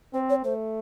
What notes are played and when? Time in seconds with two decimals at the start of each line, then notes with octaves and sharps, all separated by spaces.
0.14 C4 C5
0.29 C#5
0.44 A3 C5